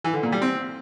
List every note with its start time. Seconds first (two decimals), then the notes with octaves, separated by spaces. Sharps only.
0.04 E3
0.14 D3
0.23 A#2
0.32 G3
0.42 C4